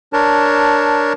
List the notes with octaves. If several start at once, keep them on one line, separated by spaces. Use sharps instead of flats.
D4 A#4 C#5 A5